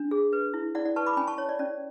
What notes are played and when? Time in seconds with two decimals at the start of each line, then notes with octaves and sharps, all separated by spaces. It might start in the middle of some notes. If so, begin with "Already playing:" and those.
Already playing: D4
0.11 G#4
0.33 B4
0.54 E4
0.75 E4 D5 F#5
0.85 D5 F#5
0.96 B4 A5 C#6
1.06 B5 D6
1.17 C#4 G#5 B5
1.27 A5 C#6
1.38 C#5
1.49 D5
1.59 C#4 D5